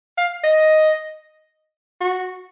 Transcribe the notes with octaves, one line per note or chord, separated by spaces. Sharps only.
F5
D#5
F#4